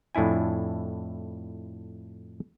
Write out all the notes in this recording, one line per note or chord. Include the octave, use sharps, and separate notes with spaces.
F2 A2 D4 E4 G#5